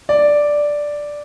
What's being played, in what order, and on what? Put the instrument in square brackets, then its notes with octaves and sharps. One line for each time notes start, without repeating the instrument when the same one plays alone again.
[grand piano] D5